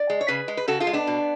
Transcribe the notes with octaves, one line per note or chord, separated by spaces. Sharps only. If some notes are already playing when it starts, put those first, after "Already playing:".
Already playing: D5
G#3
C#5
C#3 G#4 B4
G#3
B4
C#3 F#4 A4
F4 G#4
G#3
B3 D4
B2